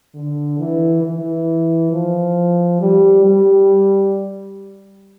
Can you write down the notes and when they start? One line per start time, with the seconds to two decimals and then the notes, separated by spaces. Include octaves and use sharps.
0.15 D3
0.59 E3
1.04 E3
1.92 F3
2.81 G3
3.25 G3